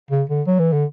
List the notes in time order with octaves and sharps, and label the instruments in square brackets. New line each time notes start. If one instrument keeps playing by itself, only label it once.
[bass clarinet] C#3
D3
F#3
E3
D3